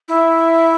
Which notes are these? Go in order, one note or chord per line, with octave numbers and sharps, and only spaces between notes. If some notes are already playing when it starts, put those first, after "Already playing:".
E4